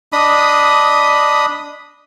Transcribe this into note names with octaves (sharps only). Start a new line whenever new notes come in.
D4 D#5 B5 D#6